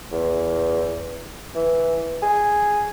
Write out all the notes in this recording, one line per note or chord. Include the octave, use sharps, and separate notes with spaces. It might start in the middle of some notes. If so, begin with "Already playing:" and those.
E2
E3
G#4